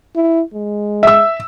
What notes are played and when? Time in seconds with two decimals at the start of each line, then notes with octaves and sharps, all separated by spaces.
0.16 E4
0.54 G#3
1.03 E5 E6